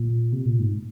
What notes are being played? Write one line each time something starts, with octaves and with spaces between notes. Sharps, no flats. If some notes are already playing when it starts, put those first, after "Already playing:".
Already playing: A#2
C3
A#2
G#2